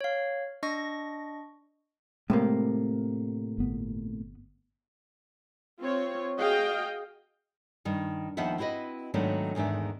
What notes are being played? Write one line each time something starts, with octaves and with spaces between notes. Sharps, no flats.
C#5 F5
D4 D#5 C#6 A#6
A2 C3 G#3 A#3
G1 B3
C4 F4 C#5
F#4 G#4 D#5 F5 G5
G2 D#3
D#2 D#3 F3 B3 E5 F#5
C4 E4 F#4 B4 D#5
G#2 D#3 F#3 A3 B3 D4
E2 G#2 D#3 D4 E5